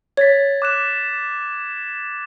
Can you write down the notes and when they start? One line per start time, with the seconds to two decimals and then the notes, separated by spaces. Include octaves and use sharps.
0.17 C#5 G#6 A6 B6
0.62 D6 F#6 E7